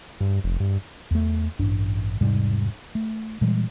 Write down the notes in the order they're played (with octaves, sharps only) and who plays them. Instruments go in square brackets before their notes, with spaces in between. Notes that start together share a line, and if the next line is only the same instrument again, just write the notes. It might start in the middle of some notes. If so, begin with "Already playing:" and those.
[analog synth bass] G2
F1
G2
[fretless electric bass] E2 A3
A1 G2 D4
E1 G#2 C3 G3
A3
A#2 E3 G3 G#3